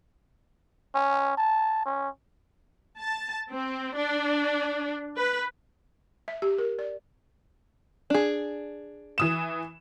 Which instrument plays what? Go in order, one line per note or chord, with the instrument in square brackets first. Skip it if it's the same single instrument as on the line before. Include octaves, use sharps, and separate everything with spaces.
[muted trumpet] C#4
A5
C#4
[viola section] A5
C4
D4
B4
[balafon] E5
G4
A#4
D5
[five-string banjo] D4 G#4
[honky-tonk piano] E3 D#6 E7